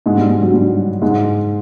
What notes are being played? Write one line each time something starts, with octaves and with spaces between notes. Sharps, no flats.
G#2 G#3
G3
G3
F#3
G3
G#2 G#3